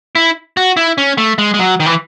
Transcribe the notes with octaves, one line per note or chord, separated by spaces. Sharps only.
E4
F#4
E4
C#4
A3
G#3
G#3
F#3
D#3
E3